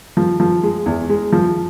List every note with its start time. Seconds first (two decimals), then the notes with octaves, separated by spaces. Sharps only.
0.17 F3
0.40 F3
0.63 G#3
0.86 E2
1.09 G#3
1.32 F3